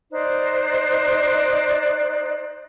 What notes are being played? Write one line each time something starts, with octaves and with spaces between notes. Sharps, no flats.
D#4 C5 D5 F#6